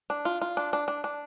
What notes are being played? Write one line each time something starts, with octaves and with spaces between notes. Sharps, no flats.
D4
F4
F4
D4
D4
D4
D4